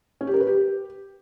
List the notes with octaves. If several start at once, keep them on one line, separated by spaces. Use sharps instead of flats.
C#4
G4
A#4
B4
G4